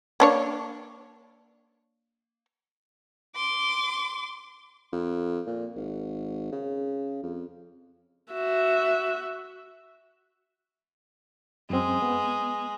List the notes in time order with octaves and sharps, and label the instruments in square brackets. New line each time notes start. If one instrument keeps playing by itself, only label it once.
[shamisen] A#3 D4 C#5
[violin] C6 D6
[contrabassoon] F2
A#2
G#1
C#3
F2
[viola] F#4 E5
[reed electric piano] F#2 C4 [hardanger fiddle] G#3
[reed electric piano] B3